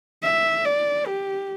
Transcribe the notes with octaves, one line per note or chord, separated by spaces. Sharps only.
E5
D5
G4